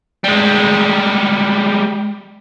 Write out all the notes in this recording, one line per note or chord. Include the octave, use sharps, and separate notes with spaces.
G3 G#3